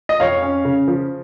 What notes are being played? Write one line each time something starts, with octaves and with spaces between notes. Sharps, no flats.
D#5
F2 C#5 F5
C#4
C#3
F3